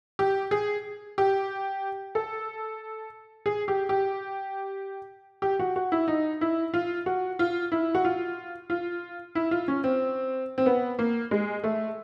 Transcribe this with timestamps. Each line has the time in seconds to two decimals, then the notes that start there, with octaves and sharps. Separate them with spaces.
0.19 G4
0.51 G#4
1.18 G4
2.15 A4
3.46 G#4
3.68 G4
3.89 G4
5.42 G4
5.59 F#4
5.76 F#4
5.92 E4
6.08 D#4
6.41 E4
6.74 F4
7.06 F#4
7.39 F4
7.72 E4
7.95 F#4
8.05 F4
8.70 F4
9.35 E4
9.51 F4
9.68 C#4
9.84 C4
10.58 C4
10.66 B3
10.99 A#3
11.31 G#3
11.64 A3